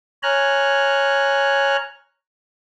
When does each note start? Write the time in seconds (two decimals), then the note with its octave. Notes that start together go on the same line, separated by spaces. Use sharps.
0.23 C#5 G#5 A#5 F6 F#6